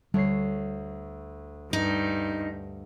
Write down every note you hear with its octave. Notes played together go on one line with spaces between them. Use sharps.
D2 G3 C#5 C7
G2 D#4